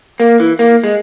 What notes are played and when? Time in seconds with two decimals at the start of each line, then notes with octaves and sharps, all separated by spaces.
0.20 A#3
0.40 E3
0.59 A#3
0.84 G#3